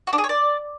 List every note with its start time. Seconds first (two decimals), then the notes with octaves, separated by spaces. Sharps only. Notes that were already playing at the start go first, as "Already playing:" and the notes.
0.07 F#4
0.13 D4
0.18 G#4
0.24 C#5
0.29 D5